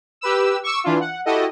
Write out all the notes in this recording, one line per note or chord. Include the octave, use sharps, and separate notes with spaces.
G4 B4 E6
C#6 D6 E6
E3 D4 E4 F4
F#5
E4 F#4 G4 A4 D#5